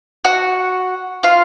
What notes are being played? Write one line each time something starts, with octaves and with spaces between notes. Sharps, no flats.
F#4 F#5
F4 F5